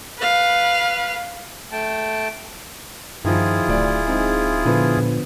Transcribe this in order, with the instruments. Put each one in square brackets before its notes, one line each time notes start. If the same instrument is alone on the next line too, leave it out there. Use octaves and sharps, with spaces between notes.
[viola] B4 F5
[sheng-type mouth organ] A3 G5 A5
[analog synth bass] G2 [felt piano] D#3 F3 [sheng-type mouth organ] E4 F4 G#4
[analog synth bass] D1 [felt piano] D2 D5
[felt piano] G#3 C4 D#4
[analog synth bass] A#2 [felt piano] D3 F3 B3
[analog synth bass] A#2